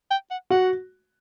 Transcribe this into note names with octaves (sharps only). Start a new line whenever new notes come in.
G5
F#5
F#4 F#5